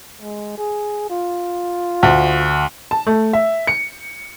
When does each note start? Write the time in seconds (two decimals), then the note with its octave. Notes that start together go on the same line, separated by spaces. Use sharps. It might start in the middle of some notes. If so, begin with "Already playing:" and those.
0.21 G#3
0.58 G#4
1.10 F4
2.03 D2
2.91 A5
3.07 A3
3.33 E5
3.67 C#7